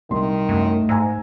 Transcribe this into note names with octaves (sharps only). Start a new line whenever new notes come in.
C2 D#3 C6
F#2 A3
G#2 G#5 A#5 E6